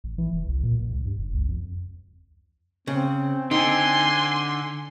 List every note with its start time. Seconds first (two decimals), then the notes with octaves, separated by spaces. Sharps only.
0.04 A1
0.18 E3
0.33 F1
0.46 C2
0.63 A#2
0.78 A#1
0.93 C#2
1.05 G2
1.19 F#1
1.34 C#2
1.49 F2
2.87 C#3 C4
3.51 D3 D#4 G#5 C6